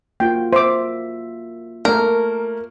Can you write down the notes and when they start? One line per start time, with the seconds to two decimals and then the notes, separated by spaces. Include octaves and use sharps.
0.20 A#3 F4 F#4 G5
0.53 C5 E5 D6
1.85 A3 A#3 A#4